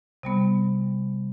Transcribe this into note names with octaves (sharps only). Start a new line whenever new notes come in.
C3 G3 B3